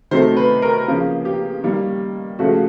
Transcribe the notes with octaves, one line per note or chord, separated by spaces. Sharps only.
C3 D#3 F#3 A3 C5
B4
A#4
C#3 F3 A#3
G4
D#3 G3 A#3
C#3 F3 A3 F#4